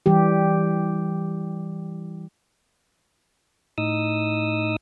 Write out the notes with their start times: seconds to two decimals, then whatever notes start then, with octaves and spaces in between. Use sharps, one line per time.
0.06 E3 G3 G4
3.78 A2 D#4 D#6 E6